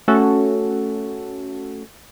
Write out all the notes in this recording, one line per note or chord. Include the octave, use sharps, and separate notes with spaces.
A3 C#4 F#4 A4